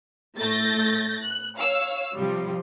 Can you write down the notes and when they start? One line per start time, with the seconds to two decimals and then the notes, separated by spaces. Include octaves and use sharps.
0.38 A2 A3 G6 A6 A#6
1.23 F#6
1.57 C#5 F5 E6
2.15 C3 F3 G3